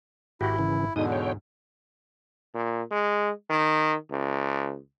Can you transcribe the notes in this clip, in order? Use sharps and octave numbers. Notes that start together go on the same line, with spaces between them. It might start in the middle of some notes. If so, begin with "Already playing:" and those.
G#1 E4 F#4 G4
C#3 E3
E2 G#2 B2 D3 D#4 D#6
C#5 G5
A#2
G#3
D#3
C#2